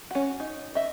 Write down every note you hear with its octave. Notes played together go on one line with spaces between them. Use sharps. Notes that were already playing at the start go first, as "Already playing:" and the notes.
C#4 F#4
D#4
D#5 E5